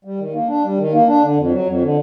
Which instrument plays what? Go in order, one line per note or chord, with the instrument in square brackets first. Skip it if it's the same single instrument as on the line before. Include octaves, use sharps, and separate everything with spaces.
[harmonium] G3
D#3
A#3
D4
G3
D#3
A#3
D4
D3
F2
F#3
F2
D3